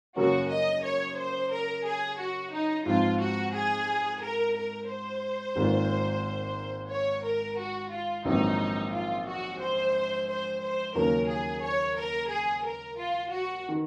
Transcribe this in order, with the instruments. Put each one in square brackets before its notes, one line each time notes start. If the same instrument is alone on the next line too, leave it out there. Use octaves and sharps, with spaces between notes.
[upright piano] F#2 C#3 F#3 A#3 C#4 [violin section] F#4
[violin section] D#5
C#5
C5
A#4
G#4
F#4
D#4
[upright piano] G#2 F3 C4 [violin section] F4
[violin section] F#4
G#4
A#4
A#4
C5
[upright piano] G#1 G#2 D#3 A#3 F4
[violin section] C#5
A#4
F#4
F4
[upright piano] A#1 G#2 D#3 F#3 C4 [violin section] D#4
[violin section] F4
F#4
C5
C5
C5
[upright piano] D#2 C#3 F#3 A#3 C#4 [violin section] A#4
[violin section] G#4
C#5
A#4
G#4
A#4
F4
F#4
[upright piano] D#3